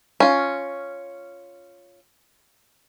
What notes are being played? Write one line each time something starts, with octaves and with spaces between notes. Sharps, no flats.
C#4 F4